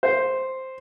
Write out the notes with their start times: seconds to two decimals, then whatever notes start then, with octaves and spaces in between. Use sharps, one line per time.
0.03 C5